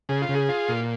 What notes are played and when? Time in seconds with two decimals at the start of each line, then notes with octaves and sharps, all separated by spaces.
0.09 C#3 G#4
0.22 F4
0.29 C#3
0.35 G#4
0.49 F4
0.69 A#2